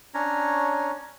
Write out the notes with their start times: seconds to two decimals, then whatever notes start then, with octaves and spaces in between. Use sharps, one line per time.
0.14 C#4 D4 C#5 A#5